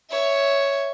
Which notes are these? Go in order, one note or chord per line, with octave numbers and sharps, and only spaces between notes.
C#5 E5